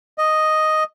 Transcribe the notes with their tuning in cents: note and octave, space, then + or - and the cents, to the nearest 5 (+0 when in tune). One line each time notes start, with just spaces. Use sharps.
D#5 +0